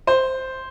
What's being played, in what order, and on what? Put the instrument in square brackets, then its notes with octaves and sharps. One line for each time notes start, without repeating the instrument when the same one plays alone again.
[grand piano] C5